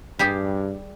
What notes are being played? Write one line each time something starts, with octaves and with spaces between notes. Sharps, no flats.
G2 G3 G4 G#4